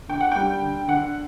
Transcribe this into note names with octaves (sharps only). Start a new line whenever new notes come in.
D3 G5
F#5
G3 G5
D3
D3 F#5